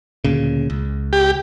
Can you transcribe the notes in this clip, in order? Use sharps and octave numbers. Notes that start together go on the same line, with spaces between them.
D2 A#2 C#3
C#2
G4